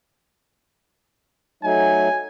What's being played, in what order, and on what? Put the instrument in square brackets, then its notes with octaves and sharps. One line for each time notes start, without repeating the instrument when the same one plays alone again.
[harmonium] F#3 A3 D#4 [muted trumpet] G#5